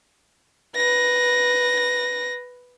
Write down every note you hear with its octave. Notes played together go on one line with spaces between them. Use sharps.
B4 A#6